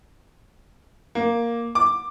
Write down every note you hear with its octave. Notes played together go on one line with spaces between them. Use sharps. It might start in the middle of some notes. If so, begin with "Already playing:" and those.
A#3
D6